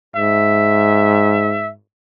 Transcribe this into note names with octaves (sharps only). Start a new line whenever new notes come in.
G#2 E5